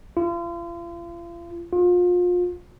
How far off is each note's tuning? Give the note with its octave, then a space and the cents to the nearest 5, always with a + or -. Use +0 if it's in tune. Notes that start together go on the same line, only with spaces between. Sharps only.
F4 -40
F4 +30